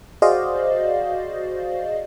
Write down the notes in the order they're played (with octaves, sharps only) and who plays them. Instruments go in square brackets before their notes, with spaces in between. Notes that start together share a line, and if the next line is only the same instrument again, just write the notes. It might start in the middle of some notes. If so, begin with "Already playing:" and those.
[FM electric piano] F#4 G#4 C5 D5 D#5 F5